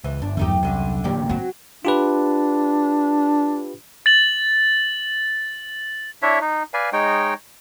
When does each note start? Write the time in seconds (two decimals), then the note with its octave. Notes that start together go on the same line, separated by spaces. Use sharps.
0.04 C#2 E3
0.22 G1 D4
0.37 E2 F#3 A3 D#4 G4
0.63 C2 F#2 D3
1.04 A1 A#2 D3 A#3 G4 D5
1.29 F#3 C4 F#4
1.85 D4 F4 G4 B4
4.06 A6 F#7
6.22 D4 E4 C#5 E5
6.41 D#4
6.74 B4 D5 F5 G#5
6.93 G#3 D#4 C#5 G5